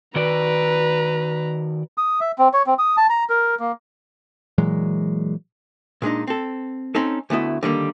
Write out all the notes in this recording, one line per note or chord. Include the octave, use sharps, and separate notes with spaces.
D#3 F#4 B4 D5 A#5
D#6
E5
C4
C#5
C4
D#6
A5
A#5
A#4
A#3
A#2 E3 F#3 G#3
A#2 G#3 D4 D#4
C4 A4
C4 C#4 D#4 A4
D2 A3 B3 E4 D#5
D3 D#3 G3 A#3